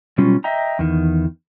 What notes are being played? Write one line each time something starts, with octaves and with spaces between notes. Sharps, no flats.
B2 F#3 G3 C#4 F4
D#5 E5 G5 A#5
E2 D#3